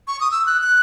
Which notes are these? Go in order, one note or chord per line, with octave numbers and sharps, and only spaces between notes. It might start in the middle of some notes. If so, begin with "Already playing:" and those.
C#6
D#6
E6
F#6
F#6